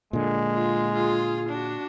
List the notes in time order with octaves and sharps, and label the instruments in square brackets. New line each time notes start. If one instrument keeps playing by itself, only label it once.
[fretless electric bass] A#2 D3 [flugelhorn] G#3
[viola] F4
F4 G#4
D4 F#4